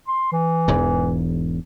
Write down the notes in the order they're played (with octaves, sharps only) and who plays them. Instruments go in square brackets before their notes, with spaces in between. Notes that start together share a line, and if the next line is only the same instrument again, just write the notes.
[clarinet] C6
E3
[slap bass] E1 E2 G#2